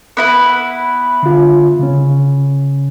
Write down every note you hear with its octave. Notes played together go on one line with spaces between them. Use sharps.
B3 E4 B4
D3 F4
C#3 C#4